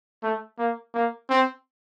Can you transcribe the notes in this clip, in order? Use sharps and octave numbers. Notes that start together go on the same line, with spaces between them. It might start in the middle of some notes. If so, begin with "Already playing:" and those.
A3
A#3
A#3
C4